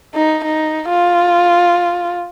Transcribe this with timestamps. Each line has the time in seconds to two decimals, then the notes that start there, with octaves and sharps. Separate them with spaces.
0.15 D#4
0.44 D#4
0.90 F4